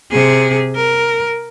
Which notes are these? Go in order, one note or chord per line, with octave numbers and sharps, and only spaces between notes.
C3 G#4
A#4